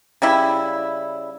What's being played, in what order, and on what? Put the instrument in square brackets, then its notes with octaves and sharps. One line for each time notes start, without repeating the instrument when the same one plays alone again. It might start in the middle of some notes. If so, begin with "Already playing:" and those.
[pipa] C#3 G3 E4 B5